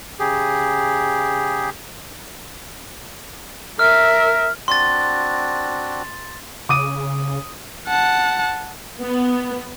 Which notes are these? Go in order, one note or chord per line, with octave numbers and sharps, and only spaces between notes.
C#3 G4 G#4
A#4 E5 F6
C4 D4 F#4 C6 A6
C#3 D6 D#6 D#7
F#5 A5
B3